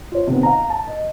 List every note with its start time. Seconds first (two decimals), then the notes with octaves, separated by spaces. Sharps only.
0.12 F4 C#5
0.27 C3 D#3 B3
0.43 F5 A#5
0.70 A5
0.87 D#5